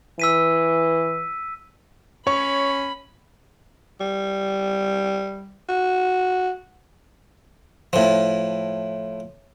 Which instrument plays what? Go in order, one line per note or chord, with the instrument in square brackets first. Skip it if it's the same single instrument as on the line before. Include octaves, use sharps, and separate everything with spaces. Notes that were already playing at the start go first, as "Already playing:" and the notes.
[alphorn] E3 [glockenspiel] E6 B6 D#7
[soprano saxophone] C#4 [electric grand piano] C#5 [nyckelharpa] B5 [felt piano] C#6
[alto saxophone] G3
F#4
[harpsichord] A2 F3